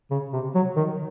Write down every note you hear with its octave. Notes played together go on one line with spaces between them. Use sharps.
C#3
C3
F#3
D#3